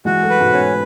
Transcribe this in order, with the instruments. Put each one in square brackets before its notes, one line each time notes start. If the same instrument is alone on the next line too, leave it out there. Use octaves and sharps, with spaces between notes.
[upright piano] E3 G#3 [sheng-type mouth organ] F#4
[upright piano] F#3 A3
[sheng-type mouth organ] B4
[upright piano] G#2 B2
[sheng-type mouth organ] C#4